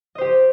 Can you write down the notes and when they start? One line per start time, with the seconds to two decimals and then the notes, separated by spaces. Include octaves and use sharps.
0.15 D#5
0.18 C5
0.21 G4